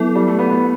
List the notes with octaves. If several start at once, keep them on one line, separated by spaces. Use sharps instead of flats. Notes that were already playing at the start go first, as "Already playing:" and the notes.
Already playing: F#3 B3 E4 A4
G3
A3
B3
B3